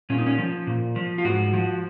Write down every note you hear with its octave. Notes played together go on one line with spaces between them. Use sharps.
A#2 C#4
D#4
C#4
F3
A#2
F3
F4
G#2 F#4
F3